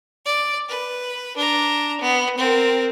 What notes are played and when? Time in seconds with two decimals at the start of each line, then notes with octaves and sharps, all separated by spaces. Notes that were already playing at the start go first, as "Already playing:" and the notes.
0.26 D5
0.70 B4
1.37 D4 A#5
2.01 B3
2.38 C4 A#4